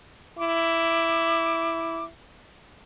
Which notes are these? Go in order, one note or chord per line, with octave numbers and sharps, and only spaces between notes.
E4 D6